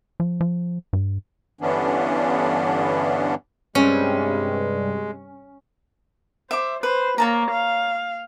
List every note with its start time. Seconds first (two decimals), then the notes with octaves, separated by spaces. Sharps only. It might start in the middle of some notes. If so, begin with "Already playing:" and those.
0.20 F3
0.41 F3
0.93 G2
1.61 G2 D3 E3 B3 C#4 D4
3.75 G2 C3 G3 G#3 C#4
6.51 C5 E5 D6
6.83 B4 C5
7.18 A#3 C#5 A5 A#5
7.51 F5